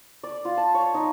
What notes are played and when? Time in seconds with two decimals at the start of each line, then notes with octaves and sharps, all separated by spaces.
0.23 D5
0.45 F4
0.57 A5
0.74 C#5
0.94 D#4